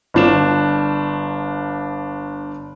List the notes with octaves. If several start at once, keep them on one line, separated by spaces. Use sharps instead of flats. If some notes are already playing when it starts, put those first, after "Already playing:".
G1 D4 E7